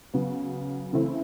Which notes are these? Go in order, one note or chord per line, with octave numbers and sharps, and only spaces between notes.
C#3 F#3 B3
C#3 E3 A3 C4 E4